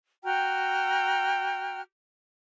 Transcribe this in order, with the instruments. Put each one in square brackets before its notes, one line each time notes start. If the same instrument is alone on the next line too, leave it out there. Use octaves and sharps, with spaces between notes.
[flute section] F#4 G5 A#5 F6